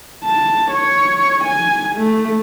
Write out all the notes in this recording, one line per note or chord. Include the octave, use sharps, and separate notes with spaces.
A5
C#5
G#5
A3